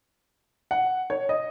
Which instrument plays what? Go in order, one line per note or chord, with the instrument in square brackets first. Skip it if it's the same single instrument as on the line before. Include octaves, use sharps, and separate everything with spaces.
[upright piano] F#5
C#5
D#5